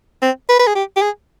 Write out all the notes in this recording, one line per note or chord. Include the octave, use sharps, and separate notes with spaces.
C4
B4
B4
G#4
G4
G4
G#4